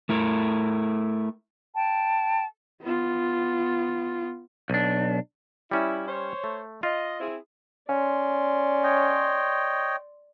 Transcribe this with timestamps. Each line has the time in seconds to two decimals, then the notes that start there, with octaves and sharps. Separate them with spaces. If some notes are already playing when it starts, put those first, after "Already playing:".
0.09 A3 E4 A#4
1.74 G5 A5
2.82 B3 F4
4.70 B1 D4
5.71 G3 C#4 E4
6.08 C5 C#5
6.44 A3
6.83 F4 D#5
7.20 C4 E4 G#4
7.89 C#4 D5 C6
8.83 C#5 D#5 G5